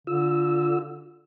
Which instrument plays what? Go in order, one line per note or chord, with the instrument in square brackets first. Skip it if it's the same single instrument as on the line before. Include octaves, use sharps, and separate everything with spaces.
[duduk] D3 [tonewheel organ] F4 E6